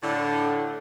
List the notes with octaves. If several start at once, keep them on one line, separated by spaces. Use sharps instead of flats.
A2 D3